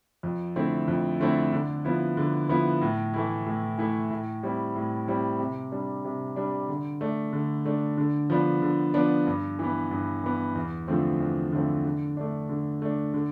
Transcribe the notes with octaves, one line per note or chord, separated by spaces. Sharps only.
F2
D3 A3 C4 E4
F2
D3 A3 C4 E4
D3
F3 B3 E4
D3
F3 B3 E4
A2
E3 A3 E4
A2
E3 A3 E4
A2
G3 C4 E4
A2
G3 C4 E4
C3
G3 D4
C3
G3 D4
D3
A3 D4
D3
A3 D4
D3
F3 B3 D4
D3
F3 B3 D4
G2
E3 B3
G2
E3 B3
E2
D3 F3 A3 C4
E2
D3 F3 A3 C4
D3
A3 D4
D3
A3 D4
D3